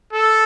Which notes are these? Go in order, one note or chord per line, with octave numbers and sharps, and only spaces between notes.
A4